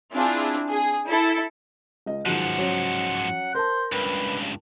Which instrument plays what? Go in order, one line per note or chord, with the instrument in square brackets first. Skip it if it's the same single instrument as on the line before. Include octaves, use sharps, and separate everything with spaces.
[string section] C4 D4 E4 F4 G#4
G#4
E4 A4
[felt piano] C#2 D#5
[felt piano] C#2 D#3 F#3 [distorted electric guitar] G#2 F3 [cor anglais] F#5
[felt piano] F#3 C#4 C#5
[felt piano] A#4 A5 [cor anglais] C5
[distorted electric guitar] C#2 G2 [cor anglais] B4